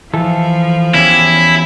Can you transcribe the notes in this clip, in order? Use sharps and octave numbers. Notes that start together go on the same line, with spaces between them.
E3 F3 A4
E2 C#4 E4 G4